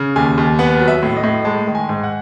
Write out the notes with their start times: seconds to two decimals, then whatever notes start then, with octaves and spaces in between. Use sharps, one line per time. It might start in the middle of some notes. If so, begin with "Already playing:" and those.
Already playing: C#3
0.16 D#2 G#5
0.38 D#2
0.59 B3 F#5
0.80 F#3
0.88 E5
1.03 A2
1.17 D#5
1.23 A2
1.45 G#3 A5
1.67 D#3
1.75 G#5
1.89 G#2
2.04 F#5